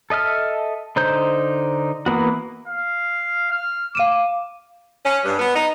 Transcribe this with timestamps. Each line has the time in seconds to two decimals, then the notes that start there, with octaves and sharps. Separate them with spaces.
0.10 A4 D#5 E5 F6
0.96 D3 D#4 C5 G6
2.06 E3 A#3 B3 F#4
2.68 F5
3.51 F6
3.95 F5 D6 D#7 E7
5.06 C#4
5.25 G2
5.39 B3
5.56 D#4